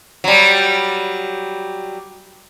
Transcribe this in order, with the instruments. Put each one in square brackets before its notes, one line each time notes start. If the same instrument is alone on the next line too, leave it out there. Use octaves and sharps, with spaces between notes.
[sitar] F#3 G3